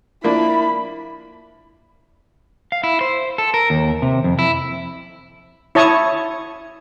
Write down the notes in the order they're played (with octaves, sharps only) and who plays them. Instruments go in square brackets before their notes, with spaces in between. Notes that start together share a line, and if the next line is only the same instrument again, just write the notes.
[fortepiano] F3 A#3 D4 [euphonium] E4 [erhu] B5
[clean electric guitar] F5
E4
C5
A4
A#4
D#2
C3
F2
E4
[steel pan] E4 C#5 A5 C#6 D#6